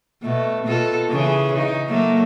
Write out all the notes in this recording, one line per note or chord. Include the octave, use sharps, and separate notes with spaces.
B2 A3
B2 F4 A4
C#3 E3 G#4
C#3 D#4
F#3 A3 A#3